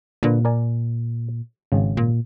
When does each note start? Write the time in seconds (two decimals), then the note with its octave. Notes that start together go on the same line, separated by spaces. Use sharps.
0.23 A#2 D3 D4 B4
0.45 A#4 D5 G#5
1.72 G#1 C#3
1.97 A#2